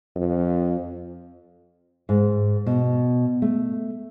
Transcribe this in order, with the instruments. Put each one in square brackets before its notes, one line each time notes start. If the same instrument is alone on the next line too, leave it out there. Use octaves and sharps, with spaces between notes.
[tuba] F2
[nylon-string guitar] G#2
B2
A3